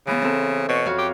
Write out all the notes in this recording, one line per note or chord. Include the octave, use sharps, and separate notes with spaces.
C#3 E3 B3
C4 A4
B2 C#5
F2 F#4 F5
G4